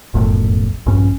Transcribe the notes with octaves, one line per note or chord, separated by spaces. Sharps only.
F1 B1 F#2 A2
A#1 G2 C#4